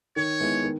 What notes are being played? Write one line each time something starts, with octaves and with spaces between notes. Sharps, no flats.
D#3 C#5
G#3 B3 E4 B4
D#3